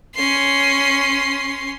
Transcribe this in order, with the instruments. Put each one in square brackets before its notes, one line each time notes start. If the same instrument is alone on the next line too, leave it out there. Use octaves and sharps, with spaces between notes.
[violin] C#4 C6